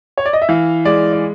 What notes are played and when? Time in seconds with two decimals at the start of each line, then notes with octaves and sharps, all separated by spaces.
0.17 C#5
0.26 D5
0.33 D#5
0.42 E5
0.49 E3 F5
0.85 G#3 D5
1.13 D5